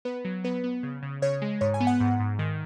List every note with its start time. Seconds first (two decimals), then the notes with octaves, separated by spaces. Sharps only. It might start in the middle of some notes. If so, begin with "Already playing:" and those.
0.05 B3 B4
0.25 F#3
0.44 B3 B4
0.64 B3
0.83 C#3
1.03 C#3
1.22 C#3 C#5
1.42 G#3
1.61 G#2 C#5
1.74 G#5
1.80 B3
1.87 F#5
2.00 G#2
2.20 G#2
2.39 D#3